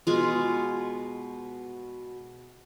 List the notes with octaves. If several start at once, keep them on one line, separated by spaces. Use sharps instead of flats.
B2 G#3 F4